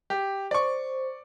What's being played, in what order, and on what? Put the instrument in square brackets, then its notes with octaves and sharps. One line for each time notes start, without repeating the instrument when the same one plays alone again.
[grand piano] G4
[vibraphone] C5 [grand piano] D5 C#6